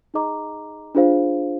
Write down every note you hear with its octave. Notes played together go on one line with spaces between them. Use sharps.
D#4 G#4 D#5 A#5 D6
D4 F4 G#4 C5 F5